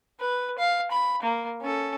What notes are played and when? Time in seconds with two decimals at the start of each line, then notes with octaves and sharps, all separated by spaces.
0.20 B4
0.59 F5
0.91 B5
1.23 A#3
1.62 C#4 A4